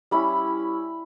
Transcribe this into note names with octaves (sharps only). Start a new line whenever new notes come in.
G3 C#4 E4 B5